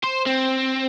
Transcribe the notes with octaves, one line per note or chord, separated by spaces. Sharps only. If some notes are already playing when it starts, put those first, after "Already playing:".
C5
C4